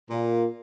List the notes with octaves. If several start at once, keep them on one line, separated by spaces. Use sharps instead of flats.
A#2